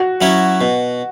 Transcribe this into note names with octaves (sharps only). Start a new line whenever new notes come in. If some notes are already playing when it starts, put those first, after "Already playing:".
Already playing: F#4
F#3 C#4 E4 C#5
B2